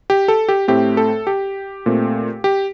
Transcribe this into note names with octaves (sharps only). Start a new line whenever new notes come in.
G4
A4
G4
A2 A3 C4 G4
A4
G4
A#2 A3 C4
G4